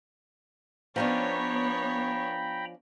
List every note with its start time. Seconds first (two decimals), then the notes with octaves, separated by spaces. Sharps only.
0.96 F3 B3 C#4 D4 C#5 G5 A#5 B5